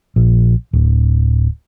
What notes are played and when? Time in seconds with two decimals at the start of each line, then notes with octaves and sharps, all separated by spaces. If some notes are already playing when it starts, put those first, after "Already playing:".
0.16 A#1
0.73 D1